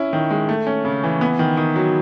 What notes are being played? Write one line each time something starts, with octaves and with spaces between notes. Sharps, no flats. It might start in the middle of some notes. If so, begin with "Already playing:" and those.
Already playing: C#4 E4
D#3
G#3
A3
C#4
C#3
E3
B3
D#3
D#3
F#3